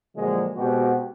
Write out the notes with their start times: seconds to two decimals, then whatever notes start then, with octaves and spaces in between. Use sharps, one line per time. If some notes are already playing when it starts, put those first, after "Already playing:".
0.16 A#2 D3 F3 F#3 G#3
0.57 B2 G#3 C4 F#4 G4